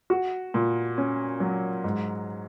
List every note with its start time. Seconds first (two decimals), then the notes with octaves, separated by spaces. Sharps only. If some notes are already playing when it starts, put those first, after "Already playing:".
0.10 F#4
0.54 A#2
0.98 C#4
1.40 F#3
1.84 G#2